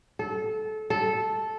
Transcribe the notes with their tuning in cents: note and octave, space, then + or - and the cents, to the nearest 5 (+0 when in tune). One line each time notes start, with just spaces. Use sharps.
A4 -25
A4 -10